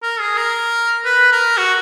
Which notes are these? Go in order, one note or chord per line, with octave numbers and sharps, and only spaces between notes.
A#4
G#4
A#4
B4
A#4
F#4